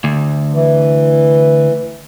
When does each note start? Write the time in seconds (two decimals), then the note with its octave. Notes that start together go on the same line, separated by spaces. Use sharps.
0.04 D2
0.53 E3